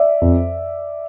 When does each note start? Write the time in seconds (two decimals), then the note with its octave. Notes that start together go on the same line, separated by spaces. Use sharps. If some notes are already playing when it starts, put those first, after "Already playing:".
Already playing: D5 E5
0.21 F2